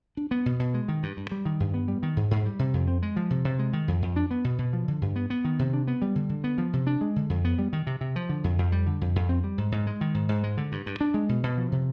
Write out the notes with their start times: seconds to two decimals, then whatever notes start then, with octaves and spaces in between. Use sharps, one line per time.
0.17 D4
0.31 B3
0.46 B2
0.59 B2
0.74 G#3
0.88 D#3
1.03 G2
1.17 G2
1.31 G3
1.45 D#3
1.60 G2
1.74 B3
1.88 G3
2.03 D#3
2.17 G#2
2.31 G#2
2.46 G3
2.59 C3
2.74 F2
2.88 C4
3.03 G#3
3.16 F3
3.30 C3
3.45 C3
3.59 G#3
3.73 D#3
3.88 F2
4.02 F2
4.16 D4
4.31 B3
4.44 B2
4.58 B2
4.73 F3
4.88 D3
5.02 G2
5.16 B3
5.30 B3
5.44 D#3
5.59 C3
5.73 D4
5.88 B3
6.02 G3
6.15 D3
6.29 D3
6.44 B3
6.58 F3
6.73 C3
6.87 D4
7.01 G#3
7.16 D3
7.30 F2
7.45 B3
7.59 G3
7.73 D#3
7.87 C3
8.01 C3
8.16 F3
8.29 D3
8.44 F2
8.58 F2
8.72 G3
8.86 D3
9.01 F2
9.16 F2
9.29 C4
9.44 G3
9.58 G#2
9.72 G#2
9.87 G#3
10.01 D#3
10.14 G#2
10.29 G#2
10.44 G#3
10.57 D3
10.72 G2
10.86 G2
11.01 D4
11.14 G#3
11.29 B2
11.43 B2
11.57 F3
11.72 C3